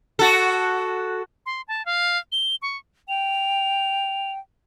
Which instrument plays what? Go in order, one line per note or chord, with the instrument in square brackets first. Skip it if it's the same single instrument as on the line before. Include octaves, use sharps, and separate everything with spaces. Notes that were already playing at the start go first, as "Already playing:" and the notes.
[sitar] F#4 A4
[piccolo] C6
A5
F5
G7
C#6
[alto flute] G5 [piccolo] F7